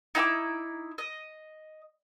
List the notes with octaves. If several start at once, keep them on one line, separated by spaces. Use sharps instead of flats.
D#4 E4 G5 D6
D#5